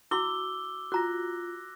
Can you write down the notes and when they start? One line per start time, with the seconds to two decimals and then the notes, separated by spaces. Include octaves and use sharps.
0.11 E4 F#4 C6 D6 E6 G7
0.92 F4 F#4 A#5 F#6 A#6